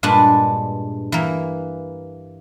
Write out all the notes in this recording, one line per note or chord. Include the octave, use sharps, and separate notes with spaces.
G2 A#2 G#3 D4 B4 A5
E3 A#3